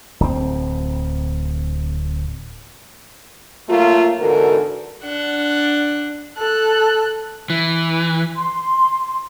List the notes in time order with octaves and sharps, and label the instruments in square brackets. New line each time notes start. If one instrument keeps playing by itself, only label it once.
[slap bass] D1 C4
[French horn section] F#3 A3 A#3 F4
E2 G#2 D3 F#4 A4 A#4
[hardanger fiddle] D4 F#5
[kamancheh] A4 F#6
[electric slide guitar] E3
[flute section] C6